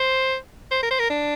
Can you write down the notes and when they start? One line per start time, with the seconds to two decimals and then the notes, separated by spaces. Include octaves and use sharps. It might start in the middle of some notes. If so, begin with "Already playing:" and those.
Already playing: C5
0.71 C5
0.83 A#4
0.91 C5
0.99 A#4
1.10 D4